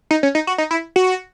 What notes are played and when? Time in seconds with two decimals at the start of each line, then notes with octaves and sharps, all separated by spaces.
0.11 D#4
0.23 C#4
0.35 D#4
0.47 F#4
0.58 D#4
0.71 E4
0.96 F#4